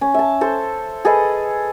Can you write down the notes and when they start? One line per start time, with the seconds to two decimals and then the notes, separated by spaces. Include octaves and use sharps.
0.01 C#4
0.14 E5 A5
0.41 A4 C5
1.05 G#4 A4 B4 D#5